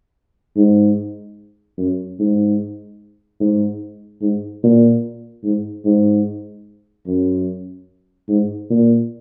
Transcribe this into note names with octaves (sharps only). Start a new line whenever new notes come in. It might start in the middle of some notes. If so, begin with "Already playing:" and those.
G#2
F#2
G#2
G#2
G#2
A#2
G#2
G#2
F#2
G#2
A#2